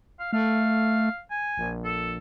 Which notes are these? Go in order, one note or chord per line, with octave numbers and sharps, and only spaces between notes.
F5
A3 F5
G#5
A#1
A4